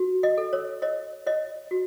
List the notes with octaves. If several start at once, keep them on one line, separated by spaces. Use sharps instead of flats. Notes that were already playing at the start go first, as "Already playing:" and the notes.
Already playing: F#4
D#5
A4
C#5
C#5 D#5
C#5 D#5
F#4